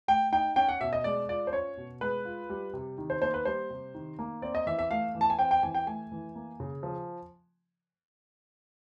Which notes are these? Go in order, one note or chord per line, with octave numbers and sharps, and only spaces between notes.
A3 G5
D#4 G5
C#4 G5
F#5
B2 E5
D#5
G#3 D5
F4 D5
C5
C#4 C#5
B2
G#3 B4
F4
G3
C3
D#3
C5
A#3 C5
B4
G3 C5
C3
D#3
A#3
C4 D5
D#5
E3 E5
E5
A3 F5
E3
A5
G#5
C4 G5
G5
E3 G#5
G5
A3 G#5
E3
A#3
C#3
F3